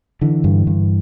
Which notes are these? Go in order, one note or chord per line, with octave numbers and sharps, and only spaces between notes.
D3 E3
G2
G2